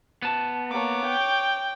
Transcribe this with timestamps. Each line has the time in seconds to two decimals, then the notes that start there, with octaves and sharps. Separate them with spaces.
0.22 B3 A5
0.71 A#3 C#5 D6
1.05 G5